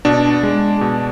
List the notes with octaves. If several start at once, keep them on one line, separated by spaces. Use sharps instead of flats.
B2 D4
G#3
B2